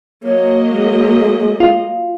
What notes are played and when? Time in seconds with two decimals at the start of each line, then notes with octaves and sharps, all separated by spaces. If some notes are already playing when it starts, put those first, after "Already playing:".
0.24 F#3 A#3 C#5 D#5
0.69 G#3
1.60 F4